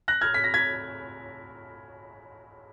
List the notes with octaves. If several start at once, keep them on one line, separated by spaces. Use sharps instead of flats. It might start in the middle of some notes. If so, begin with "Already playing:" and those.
F#6 A#6
F6 G#6
B6
A#6
G#6 B6